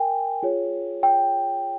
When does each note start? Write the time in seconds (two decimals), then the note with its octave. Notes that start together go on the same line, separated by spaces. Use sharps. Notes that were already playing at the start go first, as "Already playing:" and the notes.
Already playing: A#4 G5 G#5
0.43 F4 G#4 C#5
1.03 G5